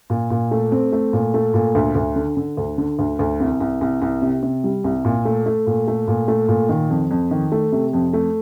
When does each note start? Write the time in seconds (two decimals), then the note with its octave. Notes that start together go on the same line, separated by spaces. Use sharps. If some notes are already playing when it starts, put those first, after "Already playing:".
0.10 A#2
0.30 A#2
0.51 A3
0.72 C4
0.92 A3
1.13 A#2
1.34 A3
1.54 A#2
1.75 D2
1.95 D2
2.16 D3
2.37 D3
2.57 D2
2.78 D3
2.99 D2
3.19 D2
3.40 C2
3.60 C2
3.81 C2
4.02 C2
4.22 C3
4.43 C3
4.64 G3
4.84 C2
5.05 A#2
5.25 A3
5.46 A3
5.67 A#2
5.88 A3
6.08 A#2
6.28 A3
6.49 A#2
6.69 D#3
6.90 F2
7.11 F2
7.31 D#3
7.52 A3
7.72 C3
7.93 F2
8.13 A3